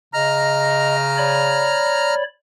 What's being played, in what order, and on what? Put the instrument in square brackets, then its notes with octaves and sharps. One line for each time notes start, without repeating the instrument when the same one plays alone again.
[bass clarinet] C#3 [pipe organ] D#5 [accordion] A#5 F6
[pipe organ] C#5 D5 B5